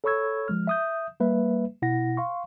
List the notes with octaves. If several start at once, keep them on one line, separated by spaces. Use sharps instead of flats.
A4 C#5 B5 C#6 E6 G#6
F3 G#3 F6
E5 D#6 G6
G3 A#3 B4 E5
B2 E4 F#5 A#6
F5 C6 C#6